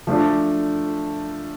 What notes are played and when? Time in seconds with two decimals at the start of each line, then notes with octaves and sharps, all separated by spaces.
0.07 F3 A3 D4